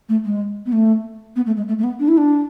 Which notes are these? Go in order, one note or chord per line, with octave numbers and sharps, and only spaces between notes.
A3
G#3
B3
A3
B3
A3
G#3
A3
A3
B3
D4
E4
D4